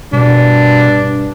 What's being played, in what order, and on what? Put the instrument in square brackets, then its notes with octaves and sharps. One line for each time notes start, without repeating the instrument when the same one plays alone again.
[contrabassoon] G2 [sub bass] B2 [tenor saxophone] D4